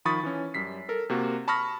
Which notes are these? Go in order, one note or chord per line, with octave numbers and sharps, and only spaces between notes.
D#3 F3 B5 C#6 D#6 A6
E3 C#4
F#2 G3 B6 C7
A4 A#4
C3 A#3 F#4
A5 B5 C#6 D#6 F6 A#6